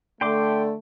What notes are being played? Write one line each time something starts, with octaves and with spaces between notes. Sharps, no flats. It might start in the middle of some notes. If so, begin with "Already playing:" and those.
D3 A3 G5 C6 D6